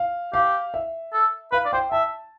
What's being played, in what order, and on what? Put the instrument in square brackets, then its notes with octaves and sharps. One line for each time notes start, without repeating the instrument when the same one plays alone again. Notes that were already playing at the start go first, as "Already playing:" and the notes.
Already playing: [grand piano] F5
[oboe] G4 [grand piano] F5
[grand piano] E5
[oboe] A4
[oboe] B4 [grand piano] F5
[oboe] D5
[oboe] C5 [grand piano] G5
[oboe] E5 [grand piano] A5